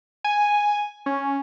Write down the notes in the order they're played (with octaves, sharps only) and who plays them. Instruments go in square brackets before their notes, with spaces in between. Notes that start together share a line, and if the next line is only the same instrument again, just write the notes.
[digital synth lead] G#5
C#4